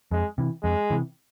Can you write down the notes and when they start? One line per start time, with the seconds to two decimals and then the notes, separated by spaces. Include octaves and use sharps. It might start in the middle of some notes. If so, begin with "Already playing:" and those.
0.11 F2 G#3
0.38 C3 E3
0.64 F2 G#3
0.90 C3 E3